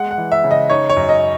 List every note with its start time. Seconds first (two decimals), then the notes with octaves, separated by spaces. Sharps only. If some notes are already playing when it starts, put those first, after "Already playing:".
Already playing: G#3 F#5
0.11 F#5
0.18 E3
0.32 E5
0.44 C#3
0.51 D#5
0.70 D#4 C#5
0.90 C#5
0.97 F#2
1.09 D#5